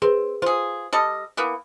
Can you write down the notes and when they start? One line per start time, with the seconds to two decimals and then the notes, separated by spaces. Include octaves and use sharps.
0.02 C4 G#4 B4
0.42 F4 G#4 C5
0.93 G3 A4 D#5
1.37 E3 A#3 B3